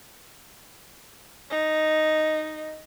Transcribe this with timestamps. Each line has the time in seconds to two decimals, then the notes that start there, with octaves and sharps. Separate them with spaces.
1.50 D#4